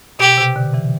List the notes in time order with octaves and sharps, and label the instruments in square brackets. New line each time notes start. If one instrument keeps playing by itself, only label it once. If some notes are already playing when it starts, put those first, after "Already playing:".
[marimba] B2 [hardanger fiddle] G4
[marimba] C3
B2 D3
C3 E3